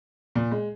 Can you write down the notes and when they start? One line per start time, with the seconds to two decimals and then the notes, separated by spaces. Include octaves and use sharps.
0.35 A#2
0.51 G#3